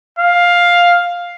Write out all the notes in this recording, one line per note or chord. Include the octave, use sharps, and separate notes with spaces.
F5